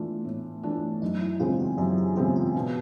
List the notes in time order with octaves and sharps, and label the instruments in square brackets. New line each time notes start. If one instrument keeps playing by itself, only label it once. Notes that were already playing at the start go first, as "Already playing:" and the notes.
Already playing: [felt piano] E3 A3 D4 F4
A2
E3 A3 D4 F4
[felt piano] F#2 [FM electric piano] D#4
[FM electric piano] E4
[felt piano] C#3 E3 G#3 C4 [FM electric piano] F4
[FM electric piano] F#4
[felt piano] F#2 [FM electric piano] G4
[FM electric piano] G4
[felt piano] C#3 E3 G#3 C4 [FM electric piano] G4
[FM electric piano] F4
[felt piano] B2